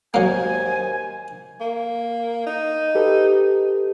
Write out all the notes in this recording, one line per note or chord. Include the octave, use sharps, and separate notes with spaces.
D#2 F#3 A#3 C5 G#5
A#3
D#4
G4 A4 B4